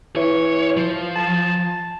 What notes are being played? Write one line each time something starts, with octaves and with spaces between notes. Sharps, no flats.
E3 C#5
F3
A5